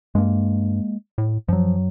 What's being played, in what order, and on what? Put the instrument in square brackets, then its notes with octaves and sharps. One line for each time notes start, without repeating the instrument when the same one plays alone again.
[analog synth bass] G2 [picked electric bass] G#3 A#3
[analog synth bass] A2
[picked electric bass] F#2 F#3 [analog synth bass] F3